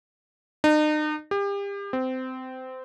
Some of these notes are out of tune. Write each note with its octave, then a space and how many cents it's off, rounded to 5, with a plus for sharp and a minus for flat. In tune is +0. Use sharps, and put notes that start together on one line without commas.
D#4 -40
G4 +35
C4 -20